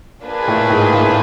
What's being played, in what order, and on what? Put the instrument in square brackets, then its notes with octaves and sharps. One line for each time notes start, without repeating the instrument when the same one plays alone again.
[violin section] A#3 D4 F4 G#4 B4
[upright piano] A2
G#2
A2